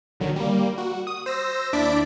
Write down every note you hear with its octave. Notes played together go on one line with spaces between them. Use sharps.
A#1 D3 D#3 F#3
G3 A#3
F#4
D#6
C5 E6 A#6
D#2 D4 E4 D5 B6 D7